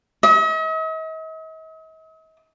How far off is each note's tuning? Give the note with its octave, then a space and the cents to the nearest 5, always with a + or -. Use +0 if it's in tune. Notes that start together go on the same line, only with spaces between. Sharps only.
D#5 +45